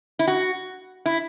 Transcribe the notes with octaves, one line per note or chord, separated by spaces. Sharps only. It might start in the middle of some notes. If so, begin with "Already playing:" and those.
E4
F#4
E4